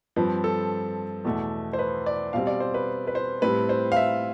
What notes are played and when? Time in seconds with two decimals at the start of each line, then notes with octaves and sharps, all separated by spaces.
0.16 G2 F3 C4 B4
0.44 A4
1.25 E2 B2 A3
1.73 C5
1.79 B4
2.06 D5
2.33 B2 G3 C4 F5
2.47 D5
2.60 C5
2.74 B4
3.07 B4
3.15 C5
3.42 A2 G3 C4 B4
3.69 C5
3.92 F5
3.97 E5